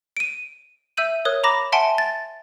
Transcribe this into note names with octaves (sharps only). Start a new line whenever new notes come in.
D7 D#7
E5 E6 G6 D#7 F#7
A#4 C#5 D#6 F#6
A#5 B5 D6 A#6 E7
E5 F#5 G#5 A5 C6 D7
A6